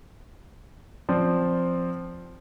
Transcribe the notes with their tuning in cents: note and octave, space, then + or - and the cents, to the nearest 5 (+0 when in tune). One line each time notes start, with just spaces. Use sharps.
F3 +0 C4 +0 D5 +0